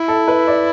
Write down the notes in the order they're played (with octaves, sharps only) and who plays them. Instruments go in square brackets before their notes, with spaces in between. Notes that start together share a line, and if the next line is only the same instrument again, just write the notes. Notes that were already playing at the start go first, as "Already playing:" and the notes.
Already playing: [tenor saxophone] E4
[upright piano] A4
B4
D5